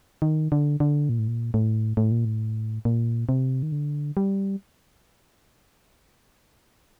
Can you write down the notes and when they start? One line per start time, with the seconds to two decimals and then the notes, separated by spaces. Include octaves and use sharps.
0.22 D#3
0.52 D3
0.80 D3
1.09 A#2
1.19 A2
1.28 A#2
1.54 A2
1.97 A2
2.11 A#2
2.25 A2
2.85 A#2
3.29 C3
3.63 D#3
3.72 D3
4.17 G3